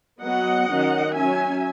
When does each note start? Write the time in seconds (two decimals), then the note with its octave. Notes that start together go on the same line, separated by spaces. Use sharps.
0.21 F#3 B3 D#5 F#5
0.68 D#3 F#3 C#4
1.14 F#3 C#4 E5 G#5